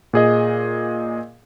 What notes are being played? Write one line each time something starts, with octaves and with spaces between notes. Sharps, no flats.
A#2 G#4 D#5